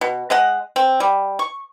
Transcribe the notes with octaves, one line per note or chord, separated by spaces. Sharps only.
B2
G#3 D#5 F#5
C4
G3
C#6